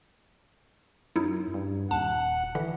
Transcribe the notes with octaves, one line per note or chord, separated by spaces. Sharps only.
F#2 D#4 E4
G2
D#1 F#5 A5
D3 E3